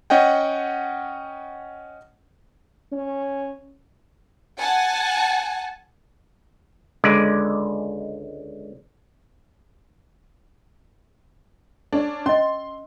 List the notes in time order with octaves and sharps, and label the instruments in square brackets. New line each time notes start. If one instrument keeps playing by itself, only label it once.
[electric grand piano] C#4 D#5 F#5 G5
[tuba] C#4
[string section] F#5 G#5 A5
[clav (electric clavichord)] C#2 D3 G#3 D5
[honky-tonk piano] C#4 D4
[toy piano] C#4 D#5 [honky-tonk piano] C6